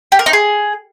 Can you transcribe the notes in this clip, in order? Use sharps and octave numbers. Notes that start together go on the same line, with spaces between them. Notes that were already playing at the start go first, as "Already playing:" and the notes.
G4
A#4
D#4
G#4